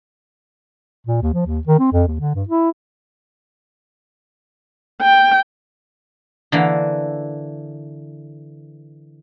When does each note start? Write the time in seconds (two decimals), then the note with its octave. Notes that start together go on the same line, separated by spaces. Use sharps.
1.07 A#2
1.22 D#2
1.34 F3
1.46 D#2
1.67 D#3
1.80 C4
1.92 F2
2.08 D#2
2.20 D3
2.35 G2
2.49 E4
5.02 G5
6.52 D3 E3 A#3